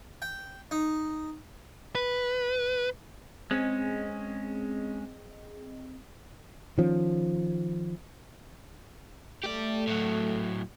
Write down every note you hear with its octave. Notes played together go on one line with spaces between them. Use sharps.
G5
D#4
B4
G#3 C4 C#4 G#4 D#5
D#3 F3 C#4
A3 G4 D5
A2 F#3